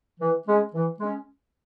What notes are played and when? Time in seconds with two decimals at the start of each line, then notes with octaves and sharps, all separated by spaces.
0.20 E3
0.48 G#3 C#4
0.74 E3
1.00 G#3 C#4